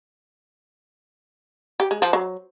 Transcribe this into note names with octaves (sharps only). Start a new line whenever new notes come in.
G4
G#3
F3
F#3